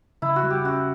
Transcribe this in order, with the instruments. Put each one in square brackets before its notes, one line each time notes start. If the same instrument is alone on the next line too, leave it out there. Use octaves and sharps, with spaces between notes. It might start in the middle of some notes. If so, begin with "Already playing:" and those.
[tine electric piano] C#3 [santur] E4
[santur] F#4
[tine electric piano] G3
[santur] G4
[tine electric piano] C#4 [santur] F#4